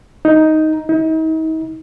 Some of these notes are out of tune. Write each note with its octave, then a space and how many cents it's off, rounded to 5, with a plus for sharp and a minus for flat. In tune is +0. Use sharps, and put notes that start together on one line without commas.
D#4 +5
D#4 +40